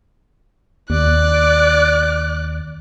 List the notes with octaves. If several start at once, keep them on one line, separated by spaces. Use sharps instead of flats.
D#2 D5 F#6